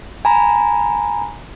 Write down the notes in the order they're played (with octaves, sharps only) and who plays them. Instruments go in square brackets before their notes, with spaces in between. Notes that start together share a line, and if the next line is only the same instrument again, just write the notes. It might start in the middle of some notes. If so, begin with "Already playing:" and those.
[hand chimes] G#5 A#5 B5